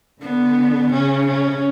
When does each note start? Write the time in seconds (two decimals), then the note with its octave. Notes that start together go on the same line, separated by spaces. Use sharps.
0.21 D3 B3
0.92 C#3 C#4
1.27 C#4